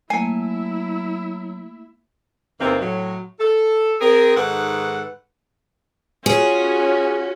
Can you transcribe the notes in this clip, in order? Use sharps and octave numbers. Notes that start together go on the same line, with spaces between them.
F#3 A3 A#3 E4 G#5
E2 C3 E3 A#3 C4 D#4
A2 F#3
A4
C4 G#4 A#4
G#2 D#3 A4 B4 F#5
C#4 F4 F#4 G#4